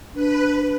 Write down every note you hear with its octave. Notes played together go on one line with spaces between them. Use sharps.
D4 B4